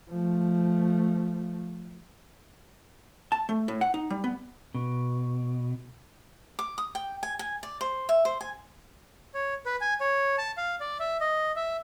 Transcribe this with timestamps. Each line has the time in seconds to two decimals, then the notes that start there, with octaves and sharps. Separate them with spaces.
0.10 F3 A3
3.32 A5
3.49 A3
3.68 A2
3.81 F#5
3.94 D#4
4.10 G3
4.24 B3
4.74 B2
6.59 D6
6.78 D#6
6.95 G5
7.23 G#5
7.39 G#5
7.63 D5
7.81 C5
8.09 E5
8.25 C5
8.41 G#5
9.34 C#5
9.66 B4
9.81 G#5
10.01 C#5
10.38 A5
10.57 F5
10.80 D5
11.00 E5
11.21 D#5
11.56 E5